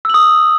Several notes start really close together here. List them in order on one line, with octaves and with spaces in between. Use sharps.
E6 F#7 D#6